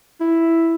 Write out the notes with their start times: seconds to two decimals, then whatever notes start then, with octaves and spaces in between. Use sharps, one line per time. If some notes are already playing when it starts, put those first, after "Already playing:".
0.21 E4